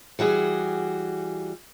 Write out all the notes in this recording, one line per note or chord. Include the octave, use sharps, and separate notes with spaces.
E3 G3 F#4 G#4